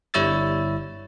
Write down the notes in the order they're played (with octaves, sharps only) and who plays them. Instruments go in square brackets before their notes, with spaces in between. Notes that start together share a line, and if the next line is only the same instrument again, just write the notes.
[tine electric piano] G1 G3 E4 C#5 E6 A6